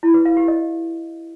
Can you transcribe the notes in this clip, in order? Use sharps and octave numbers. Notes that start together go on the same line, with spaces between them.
E4
B4
F5
G4
D#5